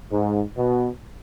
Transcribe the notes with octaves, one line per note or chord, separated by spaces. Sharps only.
G#2
B2